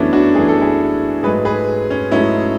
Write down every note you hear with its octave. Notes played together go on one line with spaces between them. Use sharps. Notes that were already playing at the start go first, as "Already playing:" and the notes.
Already playing: F#2 E3 A3 B3 C#4 D4 E4
D4 F#4
F#2 E3 A3 G#4
A4
E4 G#4
G#2 F#3 A3 G#4 B4
G#4 B4
C#4
G#2 F#3 A3 C#4 E4